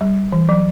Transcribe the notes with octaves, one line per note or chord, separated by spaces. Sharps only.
G3
E3
F#3